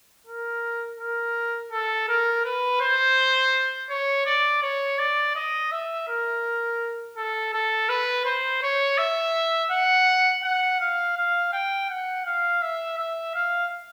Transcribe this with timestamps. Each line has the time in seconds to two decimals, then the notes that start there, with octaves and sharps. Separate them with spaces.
0.27 A#4
0.99 A#4
1.72 A4
2.08 A#4
2.45 B4
2.81 C5
3.90 C#5
4.26 D5
4.63 C#5
4.99 D5
5.36 D#5
5.72 E5
6.08 A#4
7.17 A4
7.54 A4
7.89 B4
8.25 C5
8.63 C#5
8.98 E5
9.71 F#5
10.44 F#5
10.80 F5
11.17 F5
11.53 G5
11.90 F#5
12.26 F5
12.62 E5
12.98 E5
13.35 F5